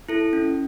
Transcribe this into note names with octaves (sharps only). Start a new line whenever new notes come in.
E4 A4
C#4